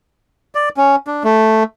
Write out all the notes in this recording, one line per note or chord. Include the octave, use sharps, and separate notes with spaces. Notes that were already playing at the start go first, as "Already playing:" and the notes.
D5
C#4
D4
A3